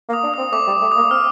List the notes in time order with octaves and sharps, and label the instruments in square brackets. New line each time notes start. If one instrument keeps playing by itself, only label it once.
[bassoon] A#3
[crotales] D#6
[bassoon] D4
[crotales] D#6
[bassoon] C4
[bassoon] A3 [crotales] D6
[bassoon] G3
A3
[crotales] D#6
[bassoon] A#3
[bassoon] C4 [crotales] F6